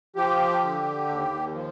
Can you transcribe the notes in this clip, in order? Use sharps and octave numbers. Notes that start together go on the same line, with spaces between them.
F3 G4
D3
D#2
F3